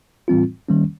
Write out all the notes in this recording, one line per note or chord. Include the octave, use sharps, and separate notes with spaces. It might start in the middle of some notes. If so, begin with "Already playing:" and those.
A2 E3 G3 C4 F4
D#3 G3 A#3 C#4